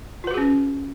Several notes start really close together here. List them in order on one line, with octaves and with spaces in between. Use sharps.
F4 B4 F#4 G#4 C#4